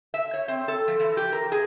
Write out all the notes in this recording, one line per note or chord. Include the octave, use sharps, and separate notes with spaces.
E5
C#5
C4
A4
F3
E3
G4
A#4
G#4